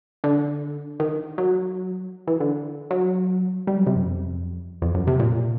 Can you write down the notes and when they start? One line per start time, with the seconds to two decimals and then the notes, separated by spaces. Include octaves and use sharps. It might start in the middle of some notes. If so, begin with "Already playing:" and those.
0.24 D3
1.00 D#3
1.38 F#3
2.27 E3
2.40 D3
2.91 F#3
3.67 G3
3.77 F#3
3.87 C3
3.96 F#2
4.05 F2
4.82 F2
4.95 F#2
5.07 C3
5.20 A#2